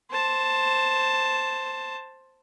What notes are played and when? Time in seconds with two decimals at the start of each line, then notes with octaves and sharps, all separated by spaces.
0.11 C5 A5